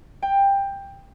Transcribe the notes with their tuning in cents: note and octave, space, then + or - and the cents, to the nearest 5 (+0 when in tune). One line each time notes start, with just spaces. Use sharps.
G5 +15